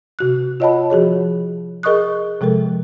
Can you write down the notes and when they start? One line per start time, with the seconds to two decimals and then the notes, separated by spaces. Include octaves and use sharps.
0.19 C3 F#4 F#6
0.60 F4 C#5 D#5 F#5 A5 B5
0.90 F3 F#4 G#4 C#5
1.83 G#4 A#4 D#5 C#6 D#6 F#6
2.41 C3 F3 G#3 A4 A#4